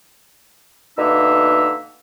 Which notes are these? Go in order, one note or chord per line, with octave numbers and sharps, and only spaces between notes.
B2 D3 A#3 D#4 E5 E6